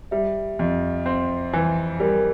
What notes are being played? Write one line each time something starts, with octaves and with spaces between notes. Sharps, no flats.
G3 E5
F2
C4 F5
E3
G3 A#4